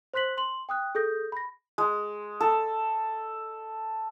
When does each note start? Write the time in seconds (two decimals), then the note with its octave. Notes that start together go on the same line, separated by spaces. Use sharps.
0.14 C5 C6 F#6 B6 F#7
0.37 C6 F#7
0.69 G5 D#6 F#6
0.95 G#4 A4 D#6 G6 A#6
1.32 B5 A#6
1.78 G#3
2.40 A4